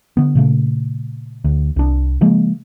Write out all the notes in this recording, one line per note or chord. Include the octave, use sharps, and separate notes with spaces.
D3 B3
A#2 C#3 A3
D2
C2 D4
C#3 F3 G#3 A#3